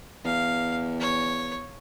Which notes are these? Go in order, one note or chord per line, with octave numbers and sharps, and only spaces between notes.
E2 F5
C#5